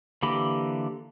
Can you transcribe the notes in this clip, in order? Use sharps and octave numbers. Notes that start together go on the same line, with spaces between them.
D3 E3 A#3 G4 B5